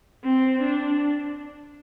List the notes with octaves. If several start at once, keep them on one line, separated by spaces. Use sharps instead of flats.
C4
D4